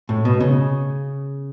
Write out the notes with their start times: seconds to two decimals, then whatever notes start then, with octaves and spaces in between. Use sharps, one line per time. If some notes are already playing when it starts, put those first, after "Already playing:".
0.09 A2
0.25 B2
0.40 C#3